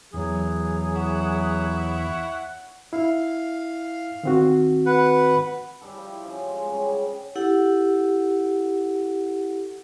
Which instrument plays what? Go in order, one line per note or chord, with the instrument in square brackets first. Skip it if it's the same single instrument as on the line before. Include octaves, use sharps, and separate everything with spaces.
[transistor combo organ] E2 [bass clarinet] F#3 [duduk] G#4
[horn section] E4 C#5 F#5
[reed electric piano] E4 [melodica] F5
[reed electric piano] D#3 C4 F#4
[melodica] B4 F#5
[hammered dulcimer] G3 G4 A4
F3 E4
C#3 F3
G#3
C#3 G3 G#4
G3 F#5 G#5 C6
[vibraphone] E4 G4 A4 F#5